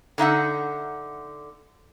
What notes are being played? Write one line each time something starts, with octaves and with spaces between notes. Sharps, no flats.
D3 D#4 E5 F#5